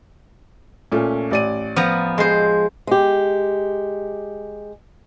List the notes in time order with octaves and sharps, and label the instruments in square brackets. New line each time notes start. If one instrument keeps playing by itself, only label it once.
[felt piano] A#2 A3 C#4
A1 D5 D#7
[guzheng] F3 B3 A#5
G#3 C5
[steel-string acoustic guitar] G#3 G4